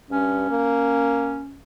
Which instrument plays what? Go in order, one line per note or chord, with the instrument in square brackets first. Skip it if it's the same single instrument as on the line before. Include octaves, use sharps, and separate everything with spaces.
[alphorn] G2 [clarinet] C#4
[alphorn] A#3